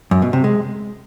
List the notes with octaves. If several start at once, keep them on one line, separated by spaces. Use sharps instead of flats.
F#2
B2
C3
G#3